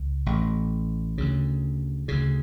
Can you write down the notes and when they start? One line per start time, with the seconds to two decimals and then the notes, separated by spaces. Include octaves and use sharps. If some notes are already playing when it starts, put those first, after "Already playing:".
Already playing: C#2
0.26 A1 A2
1.18 D2 C#3
2.08 D2 C#3